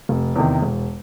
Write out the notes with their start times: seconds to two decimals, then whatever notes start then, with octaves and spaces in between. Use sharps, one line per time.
0.09 F1
0.36 E2 C3 D#3
0.62 E1